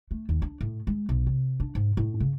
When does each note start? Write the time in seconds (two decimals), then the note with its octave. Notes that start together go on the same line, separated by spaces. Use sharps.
0.11 A3
0.29 D#2
0.42 D4
0.61 A2
0.87 G#3
1.09 B1
1.27 C3
1.60 D4
1.75 G#2
1.97 A2
2.20 C#3